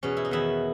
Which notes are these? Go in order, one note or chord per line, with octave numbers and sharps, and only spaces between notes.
E2 B2 C#4
E4
D#4
E2 D#3 E4